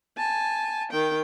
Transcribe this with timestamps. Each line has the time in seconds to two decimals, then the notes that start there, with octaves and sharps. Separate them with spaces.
0.18 G#5 A5
0.90 D#3 G5